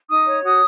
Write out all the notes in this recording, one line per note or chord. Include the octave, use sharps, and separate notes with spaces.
D#4 D#6
C#5
F#4 D#6